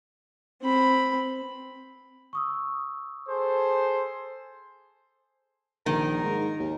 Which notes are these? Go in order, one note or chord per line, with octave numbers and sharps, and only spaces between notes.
C4 B5
C#6 D#6 E6
G#4 A4 C5
A#1 D#3 A#4
G#2
D#2